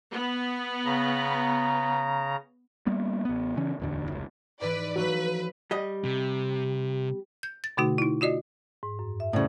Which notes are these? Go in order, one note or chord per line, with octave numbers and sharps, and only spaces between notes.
B3
C#3 A#5
G3 A#3 B3
A1 B3
C#3 E3 C#4
D1 E2 D3
F1 C#2
G#2 E3 B4 D5
F3 F#3 A3 B4
G3 D#5
C3
G6
A6
B2 D3 A3 D#4 F#4
D#4 E4
F4 F#4 D5 D#5
G#2
F#2
E5
A2 C#3 C5 D5